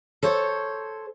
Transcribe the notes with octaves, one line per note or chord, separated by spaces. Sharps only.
A4 C5 C#5